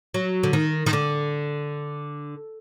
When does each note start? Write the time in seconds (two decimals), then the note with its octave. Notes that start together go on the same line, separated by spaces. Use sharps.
0.14 F#3
0.43 D3
0.53 D#3
0.86 D#3
0.93 D3